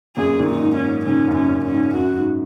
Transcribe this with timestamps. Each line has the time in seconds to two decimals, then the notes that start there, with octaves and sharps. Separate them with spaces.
0.17 F#2 A#2 G#4
0.39 A#2 D#3
0.47 D#4
0.61 G#2
0.76 C#4
0.84 G#2
1.06 G#2 C#3 C#4
1.28 F#2
1.36 C#4
1.50 F#2
1.65 C#4
1.72 G#2
1.95 F#2 F#4
2.17 G#2